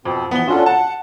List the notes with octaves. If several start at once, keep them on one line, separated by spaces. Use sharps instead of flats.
F2 B2 C4
E3 F3 B3 G7
C#4 D4 F4 F#4 A4
F#5 A5